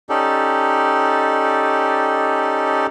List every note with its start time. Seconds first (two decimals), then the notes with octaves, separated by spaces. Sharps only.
0.10 C#4 D#4 G4 A4 D5